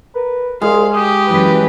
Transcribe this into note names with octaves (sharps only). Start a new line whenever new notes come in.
A#4 B4
C2 G#3 F5
G4 D#6
F#2 E3 B4